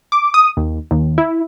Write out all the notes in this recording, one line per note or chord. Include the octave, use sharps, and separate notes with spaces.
D6
D#6
D#2
D#2
E4